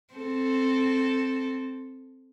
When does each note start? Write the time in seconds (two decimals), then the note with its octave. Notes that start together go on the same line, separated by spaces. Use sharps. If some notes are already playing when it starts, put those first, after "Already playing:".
0.14 C4 A4